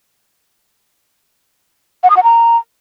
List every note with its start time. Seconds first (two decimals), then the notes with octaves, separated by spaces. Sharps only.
2.03 F#5
2.10 D#6
2.17 F#5
2.23 A#5